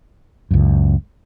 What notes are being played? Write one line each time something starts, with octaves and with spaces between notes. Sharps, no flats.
C#2 F#2